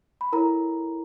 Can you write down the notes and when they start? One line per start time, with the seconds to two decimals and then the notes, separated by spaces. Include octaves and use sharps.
0.21 B5
0.33 E4 A4 A#4 C#5 A#5